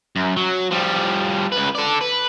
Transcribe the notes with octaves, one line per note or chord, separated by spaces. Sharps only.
F#2
F#3
F3 G3
C#2 B4
A4 D5
B4